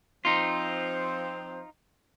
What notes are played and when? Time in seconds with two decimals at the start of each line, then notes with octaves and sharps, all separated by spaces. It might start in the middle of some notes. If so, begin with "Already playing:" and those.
0.25 F3 C4 D#4 F4 C5